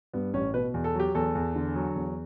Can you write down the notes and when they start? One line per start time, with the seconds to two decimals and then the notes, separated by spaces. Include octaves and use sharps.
0.13 G2 B3
0.34 A1 C#4
0.54 B2 B4
0.74 E2
0.84 A4
0.95 F#3 G4
1.15 E2 A4
1.35 E2
1.56 D3
1.76 F#3
1.96 E2